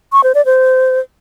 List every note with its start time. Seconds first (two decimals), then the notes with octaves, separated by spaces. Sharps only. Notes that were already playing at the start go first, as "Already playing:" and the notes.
0.12 C#6
0.24 C5
0.35 D5
0.46 C5